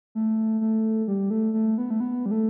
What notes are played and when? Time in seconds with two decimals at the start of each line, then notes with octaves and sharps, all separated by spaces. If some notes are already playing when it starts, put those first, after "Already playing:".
0.15 A3
0.61 A3
1.08 G3
1.30 A3
1.53 A3
1.78 B3
1.90 A3
2.00 B3
2.26 G3
2.31 A3